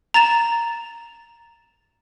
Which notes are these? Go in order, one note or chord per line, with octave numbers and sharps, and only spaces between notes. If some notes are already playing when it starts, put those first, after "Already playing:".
A#5 A6 E7